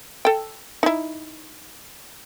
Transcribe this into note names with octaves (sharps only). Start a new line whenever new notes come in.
A4 G5
D#4 E4